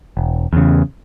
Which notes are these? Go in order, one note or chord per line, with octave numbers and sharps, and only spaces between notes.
E1
E2 C#3